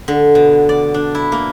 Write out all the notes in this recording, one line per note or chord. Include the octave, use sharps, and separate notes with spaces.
D3
B2
D5
D4
E4
A#3